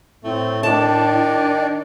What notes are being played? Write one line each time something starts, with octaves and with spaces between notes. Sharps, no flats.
A2 A3 C4
D#3 D4 D5 A5